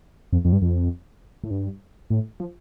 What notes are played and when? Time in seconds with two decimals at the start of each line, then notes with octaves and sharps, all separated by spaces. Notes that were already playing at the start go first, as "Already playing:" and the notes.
0.32 F2
0.45 F2
0.52 G2
0.62 F2
1.44 A2
1.51 G2
2.10 A2
2.40 F3